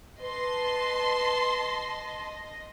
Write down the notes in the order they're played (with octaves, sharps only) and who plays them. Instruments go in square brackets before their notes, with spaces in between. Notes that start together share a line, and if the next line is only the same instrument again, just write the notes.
[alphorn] B4 [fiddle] D#5 [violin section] A5 C6